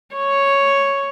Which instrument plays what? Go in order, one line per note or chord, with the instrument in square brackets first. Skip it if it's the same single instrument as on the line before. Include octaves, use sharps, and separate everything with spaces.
[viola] C#5 C#6